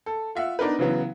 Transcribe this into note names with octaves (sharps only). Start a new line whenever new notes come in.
A4
F4 E5 F#5
B3 D4 D#4 A#4 B4
C#3 E3 F#3 B3